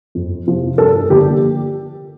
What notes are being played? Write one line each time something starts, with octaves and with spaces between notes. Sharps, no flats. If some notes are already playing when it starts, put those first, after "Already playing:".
F2
C3 F3
G2 A4
D3 F3 A#3 G4